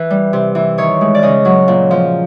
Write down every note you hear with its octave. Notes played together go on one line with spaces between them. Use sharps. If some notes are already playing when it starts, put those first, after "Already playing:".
Already playing: E3 B4
G3
C3
E3
D#3 C#5
G#3
D5
C#3 D#5
F#3
A#2
F3